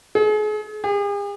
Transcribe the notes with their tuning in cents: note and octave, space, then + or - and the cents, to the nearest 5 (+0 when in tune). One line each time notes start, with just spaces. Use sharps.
G#4 +40
G#4 -45